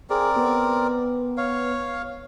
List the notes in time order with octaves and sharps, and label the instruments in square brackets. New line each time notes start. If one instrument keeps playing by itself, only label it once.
[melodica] C4 A#4 D5 [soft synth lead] G#4
[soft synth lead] B3
[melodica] C#5 F5